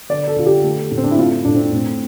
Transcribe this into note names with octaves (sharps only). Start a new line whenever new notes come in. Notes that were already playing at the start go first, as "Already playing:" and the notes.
D3 D5
A4
D3 F4
G4
A3
A2
C4
D4
E4
A3 F4
A2 D4
C4
A2